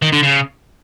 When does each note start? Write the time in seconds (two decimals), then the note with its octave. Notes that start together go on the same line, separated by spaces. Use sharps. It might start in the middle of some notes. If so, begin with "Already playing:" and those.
0.02 D#3
0.12 D3
0.23 C#3